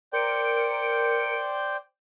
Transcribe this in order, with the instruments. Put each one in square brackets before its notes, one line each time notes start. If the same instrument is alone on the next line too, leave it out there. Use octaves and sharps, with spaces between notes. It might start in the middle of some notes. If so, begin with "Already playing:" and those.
[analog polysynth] A#4 C#7 D7 [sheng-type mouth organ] C5 D5 G5